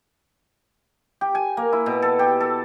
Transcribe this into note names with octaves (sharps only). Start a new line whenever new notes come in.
G4
G#5
A#3
E4
B2
A4
G4
A4